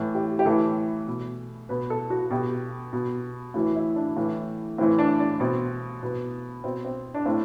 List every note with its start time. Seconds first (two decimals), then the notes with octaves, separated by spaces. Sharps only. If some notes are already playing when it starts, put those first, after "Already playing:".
Already playing: A2 E3
0.15 G4
0.39 G4
0.45 A2 E3 A4
1.07 B2
1.69 B2 B4
1.90 A4
2.10 F#4
2.31 B2 G4
2.93 B2
3.54 A2 E3 F#4
3.75 E4
3.96 D4
4.17 A2 E3
4.78 A2 E3 C4
4.99 D4
5.20 D4
5.40 B2 C4
6.03 B2 B3
6.64 B2 C4
6.85 C4
7.14 D4
7.25 A2 C4